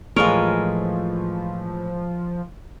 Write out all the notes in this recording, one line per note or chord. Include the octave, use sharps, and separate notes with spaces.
A2 E3 F3 G#3 A3 F4 A#4 C#5